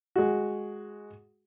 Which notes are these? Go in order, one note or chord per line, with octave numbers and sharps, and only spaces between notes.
G#3 F#4